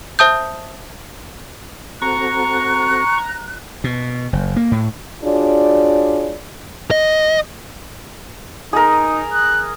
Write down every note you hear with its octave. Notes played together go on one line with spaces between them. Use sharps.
C5 E5 A5 D#6 G6
C4 F#4 A4 A#5 C#6 F#6
B2
F#1
A#3
A2
D4 F4 F#4 G#4 C#5 D5
D#5
D#4 G#4 A#4
F#6